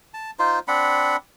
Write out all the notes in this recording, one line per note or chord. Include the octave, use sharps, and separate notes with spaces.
A5
D#4 F4 C5
C4 D4 F#5 B5